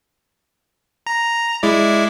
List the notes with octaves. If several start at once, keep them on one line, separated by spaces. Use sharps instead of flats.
A#5
G#3 E4 D5